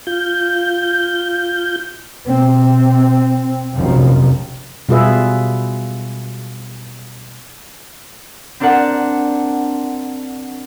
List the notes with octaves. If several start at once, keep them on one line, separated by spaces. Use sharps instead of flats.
F4 G6
B2 C4
F1 A#1 F#2 D#3 F3
B2 G3 F4 G#4 B4 E5
C4 D4 A#4 D5 F#5 A5